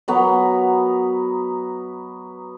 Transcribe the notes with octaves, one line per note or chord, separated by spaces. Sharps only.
F#3 B3 A#4 D#5